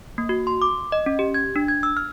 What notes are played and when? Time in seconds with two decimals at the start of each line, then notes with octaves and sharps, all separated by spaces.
0.18 A#3
0.29 F#4
0.47 C6
0.62 D6
0.92 D#5
1.06 C#4
1.19 G4
1.34 G#6
1.56 D4
1.68 G#6
1.83 E6
1.97 F6